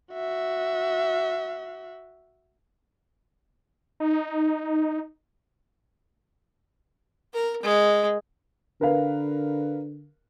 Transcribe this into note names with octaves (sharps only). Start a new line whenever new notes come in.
F#4 E5
D#4
A#4
G#3
D3 A#4 B4 F5